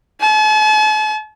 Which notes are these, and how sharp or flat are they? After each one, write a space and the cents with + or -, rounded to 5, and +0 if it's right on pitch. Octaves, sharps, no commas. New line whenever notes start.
A5 -45